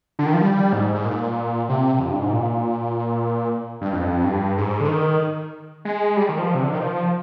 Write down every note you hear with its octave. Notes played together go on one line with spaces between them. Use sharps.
D3
D#3
F3
G3
G#2
G#2
A#2
C3
F2
G2
G#2
A#2
G2
F2
G2
G#2
D3
D#3
G#3
G3
D#3
F3
C3
D3
D#3
F3